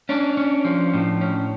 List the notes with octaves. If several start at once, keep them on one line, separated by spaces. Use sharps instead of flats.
C#4 D4
C#4
F3
A2
C#4